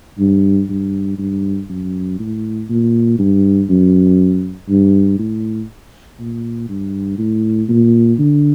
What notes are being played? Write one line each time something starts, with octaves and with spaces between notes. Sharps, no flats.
G2
G2
G2
F#2
A2
A#2
G2
F#2
G2
A2
A#2
G2
A2
A#2
D3